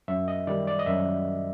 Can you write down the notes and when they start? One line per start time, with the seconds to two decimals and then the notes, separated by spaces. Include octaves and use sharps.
0.08 F#2 E5
0.28 D#5
0.47 D#3 G3 D5
0.67 D5
0.79 D#5
0.86 F#2 E5